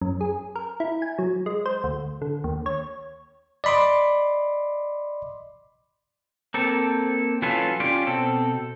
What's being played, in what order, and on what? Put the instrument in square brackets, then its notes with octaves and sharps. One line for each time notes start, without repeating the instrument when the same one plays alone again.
[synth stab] F#2
G#4
A#4
E4
G#5
F#3
G#3
C5
D2
D3
D#2
C#5
[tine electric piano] D5 D#5 B5 C6 D6
[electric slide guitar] A#3 C4 A4
E3 F#3 C#4 F4 A4 B4
C#4 F4 G4 D5
B2 C4 A4